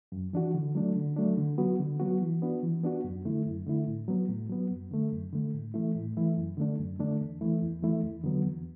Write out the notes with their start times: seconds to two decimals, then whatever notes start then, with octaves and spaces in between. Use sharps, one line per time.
0.12 F#2
0.33 E3 D4 F#4
0.54 D3
0.75 F#3 A3 D4
0.96 D3
1.16 F#3 A3 D4
1.38 D3
1.58 F#3 B3 F#4
1.80 D3
2.00 F#3 B3 F#4
2.21 E3
2.42 B3 D4 F#4
2.63 E3
2.83 B3 D4 F#4
3.04 F#2
3.25 D3 A3 E4
3.45 F#2
3.66 D3 A3 E4
3.87 A2
4.08 F#3 B3
4.29 A2
4.50 F#3 B3
4.71 F#2
4.91 D3 A3
5.12 F#2
5.32 D3 A3
5.54 A2
5.74 E3 A3 E4
5.95 A2
6.17 E3 A3 E4
6.37 F#2
6.57 D3 A3 D4
6.78 F#2
6.99 D3 A3 D4
7.21 E2
7.41 E3 A3 E4
7.61 E2
7.82 E3 A3 E4
8.03 E2
8.24 D3 F#3 B3
8.44 E2